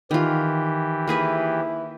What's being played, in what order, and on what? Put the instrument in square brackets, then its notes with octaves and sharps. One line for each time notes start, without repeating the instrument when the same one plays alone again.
[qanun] D#3 F4 [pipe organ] E3 G4
[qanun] A#3 G#4 B4 [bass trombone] E4